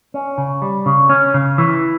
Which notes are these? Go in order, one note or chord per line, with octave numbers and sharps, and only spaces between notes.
C#4
C#3
G3
C#3
C#4
C#3
E3